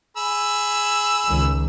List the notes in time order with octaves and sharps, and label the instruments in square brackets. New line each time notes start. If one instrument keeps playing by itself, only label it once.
[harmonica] G#4 B5 E6
[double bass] C#2 D#3